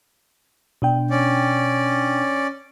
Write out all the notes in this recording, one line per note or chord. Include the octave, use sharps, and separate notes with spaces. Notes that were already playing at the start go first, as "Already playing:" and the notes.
B2 D4 G5
C#4 D5